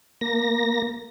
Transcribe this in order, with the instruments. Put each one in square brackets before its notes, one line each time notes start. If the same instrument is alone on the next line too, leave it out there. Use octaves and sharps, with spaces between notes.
[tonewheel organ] A#3 A#6